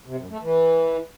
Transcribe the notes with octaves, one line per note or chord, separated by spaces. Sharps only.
C3
F#2
A3
E3